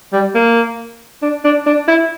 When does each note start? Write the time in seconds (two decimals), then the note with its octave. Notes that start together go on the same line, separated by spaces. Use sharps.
0.13 G3
0.35 A#3
1.22 D4
1.44 D4
1.66 D4
1.88 E4